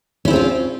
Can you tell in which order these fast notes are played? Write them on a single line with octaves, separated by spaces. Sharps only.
C#4 E4 C4 A4 F4